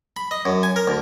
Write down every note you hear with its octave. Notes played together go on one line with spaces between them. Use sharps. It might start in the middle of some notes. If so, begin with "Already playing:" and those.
B5
D#5
F#2
G#5
A#4
D2